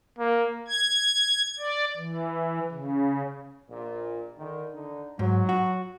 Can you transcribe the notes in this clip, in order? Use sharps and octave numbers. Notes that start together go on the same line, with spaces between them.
A#3
G#6
D5
E3
C#3
A#1 A#2
D3 D#3
D3 D#4
G#2 F#3
F#4